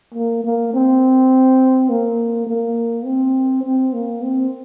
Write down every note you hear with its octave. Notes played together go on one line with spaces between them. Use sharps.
A#3
A#3
C4
A#3
A#3
C4
C4
A#3
C4